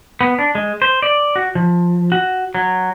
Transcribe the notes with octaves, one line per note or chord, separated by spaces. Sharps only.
B3
D4
G#3
C5
D5
F#4
F3
F#4
F#3